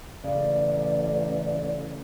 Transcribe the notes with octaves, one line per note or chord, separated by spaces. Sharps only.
A1 C#3 D5